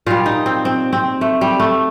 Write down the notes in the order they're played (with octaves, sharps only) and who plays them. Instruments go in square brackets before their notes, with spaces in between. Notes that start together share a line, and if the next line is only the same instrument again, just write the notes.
[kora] A#2 G3 F4
D#4
C4
C4
C4
A3
G3
A3